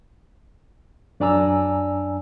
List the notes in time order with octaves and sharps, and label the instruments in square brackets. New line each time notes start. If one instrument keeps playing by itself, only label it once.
[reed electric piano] F#2 D4 D5 G#5 A#5 E6